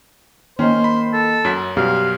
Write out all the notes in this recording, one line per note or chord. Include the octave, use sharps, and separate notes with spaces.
D#3 A#3 C#4 C5
B5
A4
F#2 F#3 B6
F#2 B2 G3 G4 F5